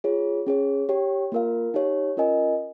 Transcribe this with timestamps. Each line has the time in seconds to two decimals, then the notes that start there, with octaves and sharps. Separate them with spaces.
0.04 F4 G#4 C#5
0.47 C#4 G#4 C#5
0.89 G4 C#5 G5
1.32 A#3 F4 A#4 F5
1.74 D#4 G4 C#5
2.17 C#4 F4 A#4 D#5 G#5